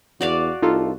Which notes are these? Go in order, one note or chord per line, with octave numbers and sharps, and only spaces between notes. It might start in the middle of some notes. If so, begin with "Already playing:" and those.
E2 F#4 D5 F5
C2 D#4 F4 A4